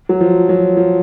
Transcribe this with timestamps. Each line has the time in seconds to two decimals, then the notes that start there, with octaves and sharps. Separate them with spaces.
0.09 F#3
0.21 F3
0.49 F#3
0.77 F3